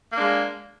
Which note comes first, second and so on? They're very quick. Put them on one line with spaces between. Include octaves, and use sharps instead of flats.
A#3 D4 G#3